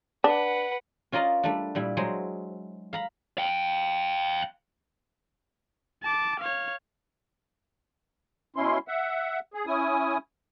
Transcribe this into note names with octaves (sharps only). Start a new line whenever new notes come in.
D4 B4 F#5
C#4 F4 A#4 D5 D#5 F5
G3 A3 D4
A#2 G3 E4
F#3 G#3 G#4 C5
F5 A#5 B5
F5 G5
A5 D6
C#5 F5
B2 C#4 E4 C6
E5 F#5
G#4
C#4 E4 G#5 D#6